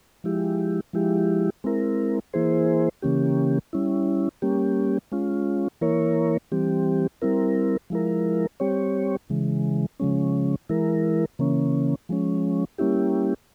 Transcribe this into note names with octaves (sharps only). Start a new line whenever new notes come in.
F3 G#3 E4 G4
F3 G#3 E4 G4
G#3 C4 E4 A#4
E3 A#3 E4 G#4 C5
C#3 E3 A#3 C#4 G4
G3 C#4 E4
G3 A#3 C#4 G4
G#3 C#4 F4
E3 A#3 E4 A#4 C#5
E3 G3 C4 G4
G3 C4 E4 A#4
F3 G#3 E4 A#4
G3 C4 G4 C#5
C#3 E3 G#3
C#3 F3 G#3 C#4
E3 G#3 E4 A#4
C#3 E3 A#3 C#4
F3 G#3 C#4
G3 A#3 C#4 E4 G4